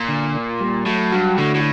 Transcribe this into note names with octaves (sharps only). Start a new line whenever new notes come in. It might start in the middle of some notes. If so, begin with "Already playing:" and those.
Already playing: A#2
D3
A#3
G3
A2 F#3
G2 F#4
A2 D3
A2